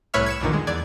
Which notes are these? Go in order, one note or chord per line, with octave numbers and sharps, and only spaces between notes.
C2 A2 B4 C#5 E5 F6
G#6 C#7 E7
B1 F2 A#2 D3 D#3
G#3
E2 D5 G#6